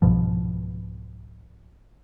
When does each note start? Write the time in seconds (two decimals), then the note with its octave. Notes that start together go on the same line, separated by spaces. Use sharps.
0.02 C2 G#2 B2 F3